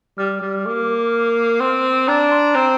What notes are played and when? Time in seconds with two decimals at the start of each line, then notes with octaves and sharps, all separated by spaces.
0.18 G3 F6
0.41 G3
0.66 A#3 D6
1.60 C4 C6
2.08 D4 A#5
2.32 C6
2.55 C4 A#5